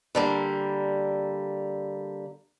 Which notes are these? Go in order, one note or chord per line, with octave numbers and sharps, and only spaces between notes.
D3 G3 A#3